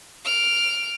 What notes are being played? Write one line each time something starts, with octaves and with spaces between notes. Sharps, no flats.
F6 D7